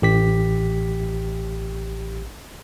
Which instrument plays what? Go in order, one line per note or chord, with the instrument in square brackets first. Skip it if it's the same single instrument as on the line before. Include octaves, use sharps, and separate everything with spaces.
[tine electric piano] A1 G4 B6